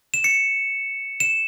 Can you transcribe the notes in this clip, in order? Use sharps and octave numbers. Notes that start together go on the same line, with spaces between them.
E7
C#7
E7